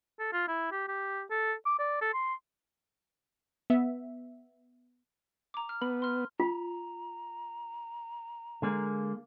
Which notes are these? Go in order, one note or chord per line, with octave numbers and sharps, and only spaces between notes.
A4
F4
E4
G4
G4
A4
D6
D5
A4
C6
B3 E5
A#5 D6
F6
B3 B5
C6 F6
F4 A#5
D3 G#3 A#3